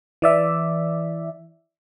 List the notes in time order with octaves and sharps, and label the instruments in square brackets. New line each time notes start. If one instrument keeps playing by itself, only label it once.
[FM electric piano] E3 D5 E5